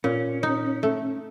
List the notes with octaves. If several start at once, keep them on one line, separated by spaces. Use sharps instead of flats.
A#2 C#4
D#4
A3